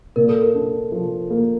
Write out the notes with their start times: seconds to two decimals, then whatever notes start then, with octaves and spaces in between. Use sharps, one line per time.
0.16 A#2 A#4
0.29 A4
0.42 A#4
0.55 D4
0.92 F3
1.30 A#3